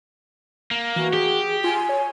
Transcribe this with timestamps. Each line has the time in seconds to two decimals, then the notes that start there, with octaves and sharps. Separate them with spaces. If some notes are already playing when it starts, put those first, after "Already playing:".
0.71 A#3
0.96 E3 F#4
1.13 G4 G#4
1.64 F4 G#5
1.89 C#5